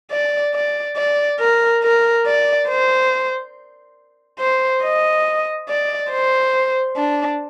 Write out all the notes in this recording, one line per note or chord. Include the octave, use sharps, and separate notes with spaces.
D5
D5
D5
A#4
A#4
D5
C5
C5
D#5
D5
C5
D4